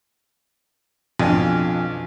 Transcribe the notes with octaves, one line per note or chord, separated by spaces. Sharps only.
B1 F2 D4 G#5